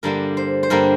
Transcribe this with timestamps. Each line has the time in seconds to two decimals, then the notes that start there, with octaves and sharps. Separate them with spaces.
0.03 G2 D3 G3 A#3 A#4
0.37 C5
0.63 C5
0.70 G2 D3 G3 A#3 A#4